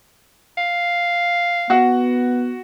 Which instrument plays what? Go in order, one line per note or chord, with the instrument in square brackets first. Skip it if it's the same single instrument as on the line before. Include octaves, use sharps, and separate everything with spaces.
[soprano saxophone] F5
[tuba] B3 [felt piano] F#4 F#5